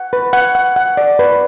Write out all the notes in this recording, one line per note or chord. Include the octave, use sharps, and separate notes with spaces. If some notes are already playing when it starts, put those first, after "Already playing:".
Already playing: F#5
B4
F#5
F#5
F#5
D5
B4